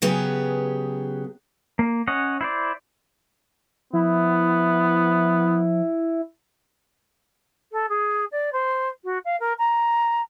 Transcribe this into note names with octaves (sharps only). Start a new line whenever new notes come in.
C#3 F#3 B3 G4 G#4
A#3
C#4 C#5 D#5 F#5
E4 C5 D5
F3 B3 E4
A4
G#4
D5
C5
F#4
F5
A#4
A#5